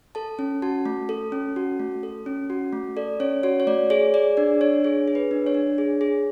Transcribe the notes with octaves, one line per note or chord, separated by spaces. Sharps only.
A4 A5
C#4
F#4 A5
A3
A4
C#4
F#4
A3
A4
C#4
F#4
A3
A4 D5
C#4 C#5
F#4 C#5
C#5
A3 D5
G#4 C#5
G#4 D5
D4 D5
D4 C#5
G#4 C#5
G#4
B4
D4
C#5
D4
G#4
G#4